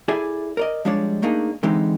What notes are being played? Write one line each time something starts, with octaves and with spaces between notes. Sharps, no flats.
E4 G#4 A4 D5 E5 G#5
A#4 D5 D#5
F3 G3 G#3 D4 C#5 D5
A3 A#3 D4 D#4 G#4
D3 E3 G#3 C4 D#4 G4